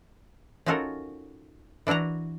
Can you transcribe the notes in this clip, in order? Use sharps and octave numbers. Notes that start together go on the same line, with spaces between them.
C#4 D#4 F4 F#4 A4 A#4
E3 D4 E4 F#4 A#5